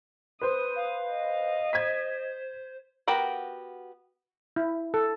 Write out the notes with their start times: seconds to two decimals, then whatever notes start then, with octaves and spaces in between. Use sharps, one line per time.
0.41 B4 C5 D#6
0.75 F5
1.10 D#5
1.73 C5 G#6 B6
3.08 B3 F#4 G4 A#4 F#5
4.56 E4
4.94 A4